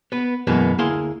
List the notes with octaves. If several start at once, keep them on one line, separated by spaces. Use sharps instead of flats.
B3 B4
F#2 B2 E3 G#3 A#3 B3
D2 A#3 E4 G#4 F5 C6